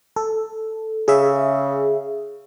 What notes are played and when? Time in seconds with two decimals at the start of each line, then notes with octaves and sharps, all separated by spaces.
0.16 A4
1.08 C#3 G#4 E5